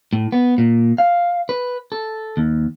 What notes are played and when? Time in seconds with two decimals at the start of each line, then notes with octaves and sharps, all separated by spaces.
0.13 A2
0.32 B3
0.58 A#2
0.98 F5
1.49 B4
1.92 A4
2.37 D#2